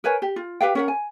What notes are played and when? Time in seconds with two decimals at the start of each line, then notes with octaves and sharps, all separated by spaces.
0.04 A#4 B4 C#5 G#5
0.22 G4
0.36 F4
0.61 G4 B4 F5 G5
0.75 C#4 A#4 F#5
0.88 G#5